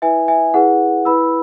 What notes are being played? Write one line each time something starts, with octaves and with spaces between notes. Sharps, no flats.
E4 B4 E5 G#5
E5 G#5
E4 G#4 B4 F#5
E4 B4 B5 E6